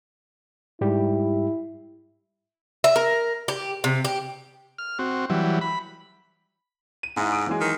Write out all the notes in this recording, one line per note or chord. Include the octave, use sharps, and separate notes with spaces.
G#2 G3 E4 G4
E5
A#4
G4
C3
G4
F6
C4 F#4
E3 F#3 G3
B5
D#7
G#2 G#3 E4
D#6 D7
E3 F#3 G#3
D#3